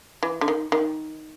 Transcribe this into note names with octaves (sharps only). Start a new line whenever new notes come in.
E3
D3
D#3
D#3